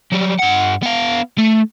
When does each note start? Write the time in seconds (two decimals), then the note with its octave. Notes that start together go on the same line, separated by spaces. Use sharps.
0.12 F#3 G3
0.39 G2 F#5
0.82 B3 F5
1.39 A3